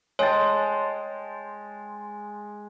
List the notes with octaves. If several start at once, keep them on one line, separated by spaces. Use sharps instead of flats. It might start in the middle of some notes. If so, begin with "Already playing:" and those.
G#3 C#5 G5 A5